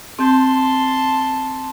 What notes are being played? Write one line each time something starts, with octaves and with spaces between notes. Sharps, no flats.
C4 A5 C6 G6